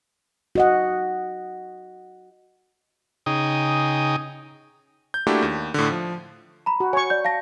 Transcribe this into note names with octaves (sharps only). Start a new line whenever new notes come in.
F#4 D#5 F#5
C#3 D#4 G#4 G5 D#6
G6
A3 A#3 D4 E4 F#4 G4
D#2
A2 D3
F3
A#5 B5
F#4
C#5 G#5 C#6
D5 G6
F5 A5 A#6